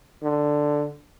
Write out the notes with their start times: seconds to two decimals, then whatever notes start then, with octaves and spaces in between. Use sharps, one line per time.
0.23 D3